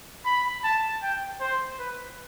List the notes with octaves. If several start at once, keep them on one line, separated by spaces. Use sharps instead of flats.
B5
A5
G5
C5
B4